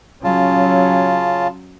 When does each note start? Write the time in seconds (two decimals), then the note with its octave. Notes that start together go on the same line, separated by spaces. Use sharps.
0.24 C#3 F#3 C#4 F4 A5